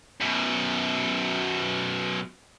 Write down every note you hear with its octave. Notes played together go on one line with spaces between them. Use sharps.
F#2 B2